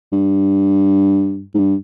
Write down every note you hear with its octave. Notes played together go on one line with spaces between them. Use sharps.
G2
G#2
G2